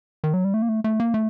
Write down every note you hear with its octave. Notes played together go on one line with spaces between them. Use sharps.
D#3
F#3
G3
A3
A#3
A3
A3
A#3
A3